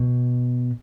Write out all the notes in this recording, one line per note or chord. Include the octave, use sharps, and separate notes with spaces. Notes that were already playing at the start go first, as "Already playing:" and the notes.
Already playing: B2